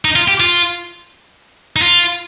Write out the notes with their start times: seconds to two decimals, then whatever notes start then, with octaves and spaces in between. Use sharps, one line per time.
0.05 D#4
0.16 F4
0.28 G4
0.40 F4
1.76 D#4
1.82 F4